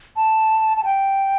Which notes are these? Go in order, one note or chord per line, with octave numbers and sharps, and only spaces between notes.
A5
A5
G5